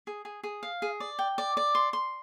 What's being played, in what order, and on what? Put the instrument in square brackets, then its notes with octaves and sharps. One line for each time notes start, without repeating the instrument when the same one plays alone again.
[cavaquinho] G#4
G#4
G#4
F5
G#4
D5
G5
D5
D5
C6
C6